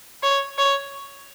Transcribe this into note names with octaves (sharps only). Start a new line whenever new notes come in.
C#5
C#5